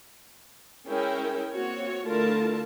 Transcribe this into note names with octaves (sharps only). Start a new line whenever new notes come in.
G#3 C#4 E4 G#4 A#4 G5
A#3 C4 F#4 C#5
D3 A3 E4 F4 A#4 A5